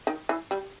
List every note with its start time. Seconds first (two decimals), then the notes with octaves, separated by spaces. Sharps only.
0.07 D#3
0.29 E3
0.51 G3